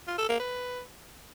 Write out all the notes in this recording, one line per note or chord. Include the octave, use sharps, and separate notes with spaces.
F4
A4
A#3
B4